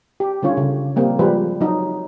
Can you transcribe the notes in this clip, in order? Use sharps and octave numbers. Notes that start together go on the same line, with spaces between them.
G4
D3 G3 C#4 F4 C#5
C#3
G3 A#3 C4
F3 G3 G#3 B4 C5
F#3 D#4